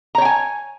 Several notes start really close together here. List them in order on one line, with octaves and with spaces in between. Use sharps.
A#5 C#5 G5 G#5